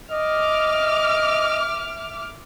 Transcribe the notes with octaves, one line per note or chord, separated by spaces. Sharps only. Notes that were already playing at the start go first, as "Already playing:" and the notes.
D#5 E5 D6 F6